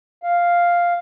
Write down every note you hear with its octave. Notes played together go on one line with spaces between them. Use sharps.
F5